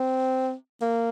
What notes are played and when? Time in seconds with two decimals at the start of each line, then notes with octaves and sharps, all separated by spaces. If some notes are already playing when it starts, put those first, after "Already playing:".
Already playing: C4
0.81 A#3